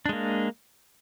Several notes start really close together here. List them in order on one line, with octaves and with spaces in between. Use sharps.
D4 G#3 A#3